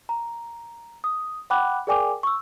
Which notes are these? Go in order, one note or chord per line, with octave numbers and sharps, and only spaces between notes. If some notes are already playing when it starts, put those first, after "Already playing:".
A#5
D#6
F#5 G5 B5 D6 F#6
G#4 A#4 D5 G5 G#5 D6
C#6 E6